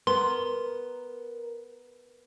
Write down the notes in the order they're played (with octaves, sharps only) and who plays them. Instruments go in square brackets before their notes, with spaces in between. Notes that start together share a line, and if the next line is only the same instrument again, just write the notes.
[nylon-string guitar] B3 [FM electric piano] A#4 [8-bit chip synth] C6